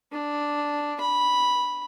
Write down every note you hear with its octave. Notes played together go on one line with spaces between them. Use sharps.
D4
B5